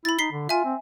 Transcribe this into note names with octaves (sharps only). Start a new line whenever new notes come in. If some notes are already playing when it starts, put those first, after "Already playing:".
E4 B5 A6
D#4 B6 C7 G7
D3
F4 E5 G#5
C4